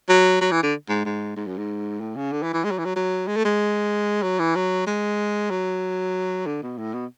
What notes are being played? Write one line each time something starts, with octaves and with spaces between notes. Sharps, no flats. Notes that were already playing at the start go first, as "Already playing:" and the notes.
F#3
F#3
E3
D3
G#2
G#2
G#2
F#2
G#2
A2
C#3
D3
E3
E3
G#3
F#3
E3
F#3
F#3
G#3
A3
G#3
F#3
E3
F#3
G#3
F#3
D3
B2
A2
B2